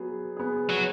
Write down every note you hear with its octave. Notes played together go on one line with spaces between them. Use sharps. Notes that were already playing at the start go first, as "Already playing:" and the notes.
Already playing: F#3 B3 G#4
B3 G#4
F#3